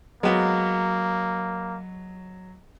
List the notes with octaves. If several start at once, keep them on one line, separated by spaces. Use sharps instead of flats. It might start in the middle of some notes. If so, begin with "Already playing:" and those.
F#3 G#3 A#3 B3